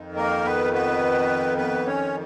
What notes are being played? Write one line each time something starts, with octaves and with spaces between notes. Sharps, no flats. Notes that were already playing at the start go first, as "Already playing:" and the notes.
Already playing: F2 D#3
A#3 A#4
B3 B4
B3 B4
B3 B4
C#4 C#5